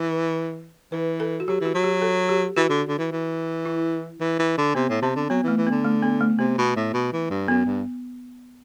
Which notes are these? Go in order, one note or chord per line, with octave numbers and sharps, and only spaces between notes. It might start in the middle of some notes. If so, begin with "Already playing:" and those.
Already playing: E3 B4
E3 B4
A4
F#4
F#3 G4
E3 F#4
F#3
G4
A4
G4
E3 F#4
D3
D3
E3
E3
E4
E3
E3
D3
C3 B3
A2
C3 C4
D3
F#3 B3
E3 A3
E3
D3 B3
A3
B3
A3
C3 B3
B2
A2
B2
E3
G2
F#2 B3
G2